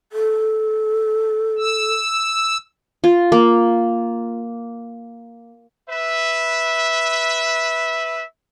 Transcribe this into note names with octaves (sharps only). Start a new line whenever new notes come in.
A4
E6
F4
A#3
B4 E5